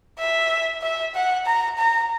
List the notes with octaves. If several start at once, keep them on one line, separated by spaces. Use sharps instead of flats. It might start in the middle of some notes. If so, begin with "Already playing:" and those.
E5
E5
F#5
A#5
A#5